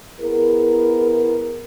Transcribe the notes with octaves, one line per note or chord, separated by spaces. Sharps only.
B3 E4 G#4 A#4